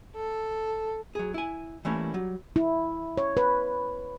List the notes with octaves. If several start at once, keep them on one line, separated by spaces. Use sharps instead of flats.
A4
F#3 G#4
E4 G#5
E3 G3 A3 A#3 C#4 E4
F#3 G3
E4
C#5
B4